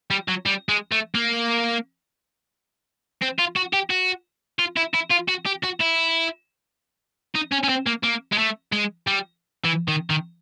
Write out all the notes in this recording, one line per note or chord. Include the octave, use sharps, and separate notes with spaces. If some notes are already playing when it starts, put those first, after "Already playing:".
G3
F#3
G3
G#3
A3
A#3
C4
F4
F#4
G4
F#4
F4
E4
E4
F4
F#4
G4
F#4
E4
D#4
C#4
C#4
C4
A#3
A#3
G#3
A3
G#3
G3
E3
D#3
D#3